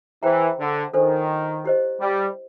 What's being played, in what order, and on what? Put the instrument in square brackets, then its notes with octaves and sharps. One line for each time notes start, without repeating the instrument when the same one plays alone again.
[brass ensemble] E3 [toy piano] G#4 C5 E5 G5 A#5
[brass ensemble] D3
[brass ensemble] D#3 [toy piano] D4 F4 A4 C5
[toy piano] E4 G4 C5 D#5
[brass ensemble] G3